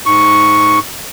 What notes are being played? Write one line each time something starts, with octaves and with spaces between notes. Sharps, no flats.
G#2 C#6